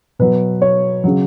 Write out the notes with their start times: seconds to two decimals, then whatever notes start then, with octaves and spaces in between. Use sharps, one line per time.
0.19 B2 F#3 B4
0.62 C#5
1.04 C#3 F#3